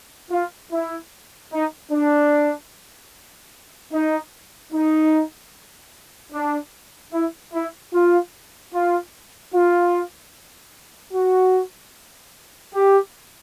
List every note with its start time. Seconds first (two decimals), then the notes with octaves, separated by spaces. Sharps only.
0.31 F4
0.72 E4
1.52 D#4
1.91 D4
3.93 D#4
4.73 D#4
6.32 D4
7.13 E4
7.53 E4
7.93 F4
8.73 F4
9.54 F4
11.13 F#4
12.74 G4